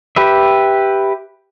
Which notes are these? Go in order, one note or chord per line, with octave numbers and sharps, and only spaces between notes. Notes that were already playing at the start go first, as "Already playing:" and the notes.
G4 B4 E5